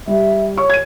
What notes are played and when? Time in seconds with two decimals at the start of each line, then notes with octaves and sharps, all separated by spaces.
0.07 G3 E5
0.58 C#5 C#6
0.70 G#6 D#7